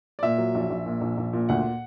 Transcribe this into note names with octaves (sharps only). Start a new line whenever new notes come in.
D5
A#2 E5
F#3
A#1
A#1
A#2
A#1
A#1
A#2
D2 F#5